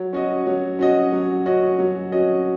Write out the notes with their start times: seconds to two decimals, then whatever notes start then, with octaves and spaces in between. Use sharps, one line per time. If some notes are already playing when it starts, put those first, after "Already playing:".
Already playing: F#3
0.13 C#4 F#4 D#5
0.46 F#3
0.79 C#4 F#4 D#5
1.12 F#3
1.46 C#4 F#4 D#5
1.79 F#3
2.12 C#4 F#4 D#5